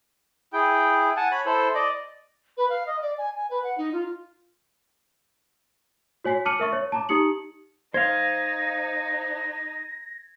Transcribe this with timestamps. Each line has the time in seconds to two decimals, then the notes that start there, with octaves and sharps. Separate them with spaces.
0.53 E4 G#4 G5
1.17 F#5 G#5 A5
1.32 C#5 B5
1.46 E4 A4 C5
1.75 D5 D#5
2.57 B4
2.69 F5
2.86 D#5
3.01 D5
3.18 G#5
3.36 G#5
3.50 B4
3.64 F#5
3.77 D#4
3.92 F4
6.24 F#4 C#5 G#5 B6 C7
6.45 A5 D6 F6 C#7 D#7 F#7
6.59 A#4 E5 C#6 A6
6.73 C#5
6.92 A5 A#5 D6
7.09 D#4 G4 D#6 C#7 F#7
7.94 D#4 C5 F5 G#6 A#6